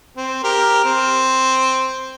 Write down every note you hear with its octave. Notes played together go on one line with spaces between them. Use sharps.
C4
G4 A#4
C4